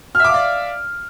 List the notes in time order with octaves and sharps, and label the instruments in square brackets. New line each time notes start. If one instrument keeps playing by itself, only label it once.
[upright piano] F6
E5
D6
F5
D5